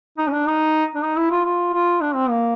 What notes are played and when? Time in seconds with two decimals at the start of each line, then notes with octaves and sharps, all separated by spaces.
0.18 D#4
0.28 C#4
0.33 D4
0.47 D#4
0.95 D4
1.03 D#4
1.17 E4
1.31 F4
1.45 F4
1.73 F4
2.01 D4
2.15 C4
2.30 A#3